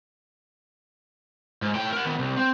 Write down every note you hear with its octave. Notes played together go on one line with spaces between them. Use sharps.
G#2
A2 G5
A#4 F#5
D#3 B3
C2
C4